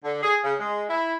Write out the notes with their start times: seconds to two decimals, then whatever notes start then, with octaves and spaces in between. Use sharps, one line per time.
0.04 D3
0.23 G#4
0.44 C#3
0.59 G#3
0.89 E4